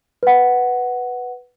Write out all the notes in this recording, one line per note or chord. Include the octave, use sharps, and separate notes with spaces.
B4 F#5